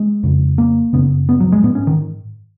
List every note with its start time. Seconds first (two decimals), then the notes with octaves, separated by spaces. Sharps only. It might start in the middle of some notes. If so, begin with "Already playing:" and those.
Already playing: G#3
0.23 F2 C#3
0.58 A#3
0.93 F#2 C#3 B3
1.29 B3
1.40 F#3
1.52 G#3
1.63 G#2 B3
1.75 C#4
1.87 D#3